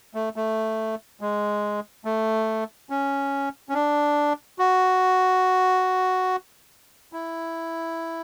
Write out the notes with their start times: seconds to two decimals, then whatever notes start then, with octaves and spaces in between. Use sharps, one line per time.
0.14 A3
0.36 A3
1.21 G#3
2.05 A3
2.90 C#4
3.69 C#4
3.74 D4
4.59 F#4
7.13 E4